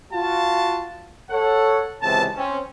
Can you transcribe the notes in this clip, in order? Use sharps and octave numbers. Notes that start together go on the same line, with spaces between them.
F4 F#4 A5
A4 C#5 F#5
C#2 C3 E3 C4 A5
C4 C#4